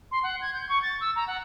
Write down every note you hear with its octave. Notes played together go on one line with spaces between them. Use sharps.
C6
F#5
G#6
G6
C#6
A6
E6
A#5
F#5